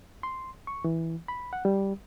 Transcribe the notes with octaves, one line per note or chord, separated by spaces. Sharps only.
C6
C#6
E3
B5
F#5
G3